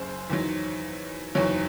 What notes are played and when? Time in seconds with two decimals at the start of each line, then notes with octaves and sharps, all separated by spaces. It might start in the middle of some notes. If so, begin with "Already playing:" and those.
Already playing: F#1 F#2 C#3 C5
0.30 E2 D#3 F#3
1.35 F#1 E2 D#3 F#3 C#5